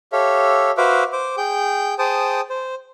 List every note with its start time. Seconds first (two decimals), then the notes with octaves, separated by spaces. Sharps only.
0.12 G4 A4 C#5 E5 F5
0.77 F#4 B4 C5 E5 F5 D6
1.13 C5 D6
1.37 G#4 G5 G6
1.99 G#4 C5 G5 A5 D#6
2.50 C5